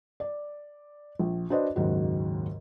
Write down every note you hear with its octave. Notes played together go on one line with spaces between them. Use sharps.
D5
A#1
D4 F#4 B4 C5 D5 D#5
F#1 D#2 G#2 F#4